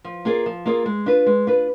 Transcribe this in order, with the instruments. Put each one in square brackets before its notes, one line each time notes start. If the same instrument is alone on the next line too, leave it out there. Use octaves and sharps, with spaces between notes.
[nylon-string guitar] F3
A#3 F4 G#4 D5
F3
A#3 F4 G#4 D5
G#3
D4 F4 B4
G#3
D4 F4 B4